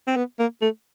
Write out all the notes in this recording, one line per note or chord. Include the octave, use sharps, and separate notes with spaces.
C4
B3
A#3
A3